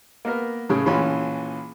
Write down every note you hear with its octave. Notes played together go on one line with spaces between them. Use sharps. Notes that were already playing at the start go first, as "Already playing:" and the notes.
A#3 B3 A#4
A2 C#3
A#1 E3 C#4 F4 B5